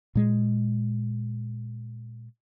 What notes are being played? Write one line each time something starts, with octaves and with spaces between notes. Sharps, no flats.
A#2 G#3